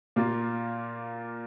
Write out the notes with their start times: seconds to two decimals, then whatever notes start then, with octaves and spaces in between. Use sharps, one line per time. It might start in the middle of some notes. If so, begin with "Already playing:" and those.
0.16 A#2 A#3 F4